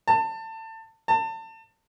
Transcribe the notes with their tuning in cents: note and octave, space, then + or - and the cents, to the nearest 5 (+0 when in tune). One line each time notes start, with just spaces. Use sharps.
A5 +25
A5 +30